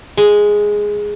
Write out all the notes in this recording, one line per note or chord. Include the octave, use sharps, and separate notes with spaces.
G#3